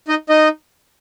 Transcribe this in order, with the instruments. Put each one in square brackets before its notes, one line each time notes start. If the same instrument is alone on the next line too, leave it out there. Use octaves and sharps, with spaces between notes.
[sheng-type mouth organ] D#4 D#5
D#4 D#5